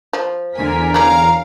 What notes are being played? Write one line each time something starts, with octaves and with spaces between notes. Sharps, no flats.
F3
E2 D3 A#4 G#5 B6
F#3 C#4 D4 F5 A#5